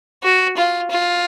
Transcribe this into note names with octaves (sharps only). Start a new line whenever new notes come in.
F#4
F4
F4